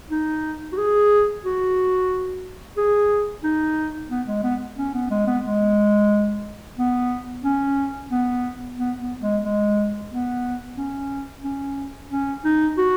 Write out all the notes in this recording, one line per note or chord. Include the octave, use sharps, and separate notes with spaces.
D#4
F#4
G#4
F#4
G#4
D#4
B3
G#3
B3
C#4
B3
G#3
B3
G#3
B3
C#4
B3
B3
B3
G#3
G#3
B3
C#4
C#4
C#4
D#4
F#4